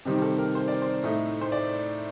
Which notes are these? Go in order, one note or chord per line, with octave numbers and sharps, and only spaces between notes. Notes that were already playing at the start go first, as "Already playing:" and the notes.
C3 D#3 G3 C4 D#4 G4
A4
A#4
C5
D5
C5
A2 A3 D#4
C5
D5